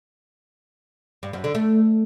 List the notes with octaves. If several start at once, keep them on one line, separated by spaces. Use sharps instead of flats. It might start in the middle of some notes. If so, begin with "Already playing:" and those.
G2
F#2
D3
A3